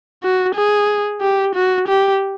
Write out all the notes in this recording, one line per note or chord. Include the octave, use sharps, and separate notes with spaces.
F#4
G#4
G4
F#4
G4